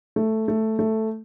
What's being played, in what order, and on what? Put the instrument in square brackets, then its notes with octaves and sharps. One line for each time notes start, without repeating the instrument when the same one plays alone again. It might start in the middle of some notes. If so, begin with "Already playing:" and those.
[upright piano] A3
A3
A3